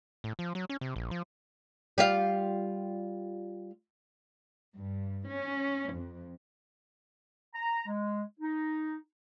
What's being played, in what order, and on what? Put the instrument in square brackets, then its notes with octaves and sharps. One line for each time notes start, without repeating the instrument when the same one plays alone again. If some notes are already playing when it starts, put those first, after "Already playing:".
[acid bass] A2
F3
F#3
C#4
C3
A#1
F3
[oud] G3 F4 F5
[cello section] G2
C#4
F2
[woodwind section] A#5
G#3
D#4